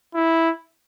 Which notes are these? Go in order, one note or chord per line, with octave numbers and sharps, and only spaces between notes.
E4